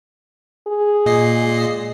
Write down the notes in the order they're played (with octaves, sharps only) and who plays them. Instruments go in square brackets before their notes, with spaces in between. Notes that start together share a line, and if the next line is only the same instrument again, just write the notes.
[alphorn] G#4
[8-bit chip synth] A#2 D#5 C7
[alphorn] G#3